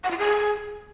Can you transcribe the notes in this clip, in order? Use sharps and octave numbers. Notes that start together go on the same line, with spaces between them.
F#5
F4
G#4